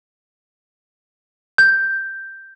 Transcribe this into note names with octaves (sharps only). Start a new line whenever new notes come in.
G6